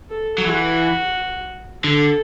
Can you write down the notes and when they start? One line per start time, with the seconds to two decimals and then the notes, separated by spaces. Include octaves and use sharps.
0.10 A4
0.38 F#3
0.45 E3 F#4
1.84 D3 A4